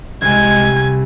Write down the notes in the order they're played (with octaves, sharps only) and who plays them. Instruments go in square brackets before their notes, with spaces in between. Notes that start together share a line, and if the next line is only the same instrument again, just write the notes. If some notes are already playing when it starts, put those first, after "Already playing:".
[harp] C2 C3 [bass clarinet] G#3 [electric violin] G#5 G#6